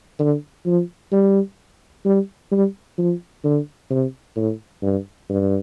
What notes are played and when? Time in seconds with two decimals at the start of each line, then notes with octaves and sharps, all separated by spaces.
0.19 D3
0.66 F3
1.12 G3
2.05 G3
2.51 G3
2.98 F3
3.44 D3
3.90 C3
4.36 A2
4.82 G2
5.29 G2